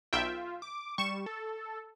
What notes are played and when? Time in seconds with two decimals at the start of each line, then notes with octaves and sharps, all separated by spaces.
0.13 B1 F4 E5 G5
0.62 D6
0.98 G3 C#6 E7
1.26 A4